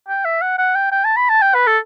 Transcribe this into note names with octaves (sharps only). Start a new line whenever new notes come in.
G5
E5
F#5
F#5
G5
G5
A5
B5
A5
G5
B4
A4